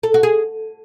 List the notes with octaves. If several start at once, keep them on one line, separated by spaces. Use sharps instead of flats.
A4
F#4
G#4